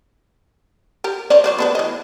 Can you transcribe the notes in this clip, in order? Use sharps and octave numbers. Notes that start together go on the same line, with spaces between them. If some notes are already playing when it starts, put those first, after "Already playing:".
G4 A#4
F3 C#4 D5
F#3 C5 D5
B3 D4 B4
E3 D#5